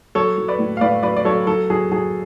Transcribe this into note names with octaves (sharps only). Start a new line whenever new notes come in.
F#3 A4 C#5
F#3
B4 D5
A2
F5
A2 B4 D5
F#3 B4 D5
D5
F#3 A4 C#5
F#3 A4
F#3 G#4
F#3 G#4